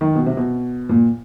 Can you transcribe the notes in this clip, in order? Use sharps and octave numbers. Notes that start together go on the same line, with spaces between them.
D#3
B2
C3
B2
A#2